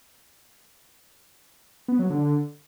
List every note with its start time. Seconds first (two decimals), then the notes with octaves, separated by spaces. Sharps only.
1.88 B3
1.99 F#3
2.10 D3